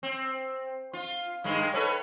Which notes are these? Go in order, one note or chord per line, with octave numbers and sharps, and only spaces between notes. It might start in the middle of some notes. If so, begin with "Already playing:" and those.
C4
F4
G2 D#3 G#3
A4 B4 C#5